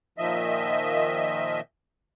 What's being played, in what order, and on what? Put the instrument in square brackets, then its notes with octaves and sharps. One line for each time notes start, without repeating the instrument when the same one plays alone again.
[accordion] A#2 D#3 F3 D#5 E5